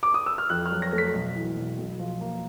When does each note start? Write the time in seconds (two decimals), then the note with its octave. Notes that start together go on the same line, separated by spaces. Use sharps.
0.03 D6
0.14 D#6
0.26 E6
0.38 F6
0.49 F2 F#6
0.66 F6
0.71 F#3
0.82 A#6
0.93 A3
0.98 B6
1.14 B1
1.36 E3
1.57 B1
1.78 B1
1.99 F3
2.21 A#3